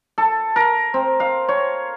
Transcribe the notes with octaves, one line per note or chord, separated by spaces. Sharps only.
A4
A#4
C4
F5
C#5